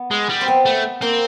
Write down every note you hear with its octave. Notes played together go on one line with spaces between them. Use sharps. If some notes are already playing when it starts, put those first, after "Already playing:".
Already playing: B3
G#3
G3
C4
B3
A3
A#3 C4